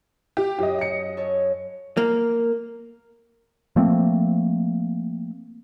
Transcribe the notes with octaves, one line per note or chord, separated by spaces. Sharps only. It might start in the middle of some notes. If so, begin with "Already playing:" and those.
G4
F#2 G4 D#5
D#5 C#7
A4 C#5
A#3
F3 A3 A#3 C4